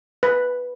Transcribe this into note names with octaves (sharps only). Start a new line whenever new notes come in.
B4